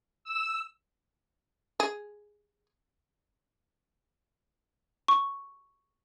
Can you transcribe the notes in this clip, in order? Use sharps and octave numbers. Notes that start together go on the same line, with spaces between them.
E6
G#4
C#6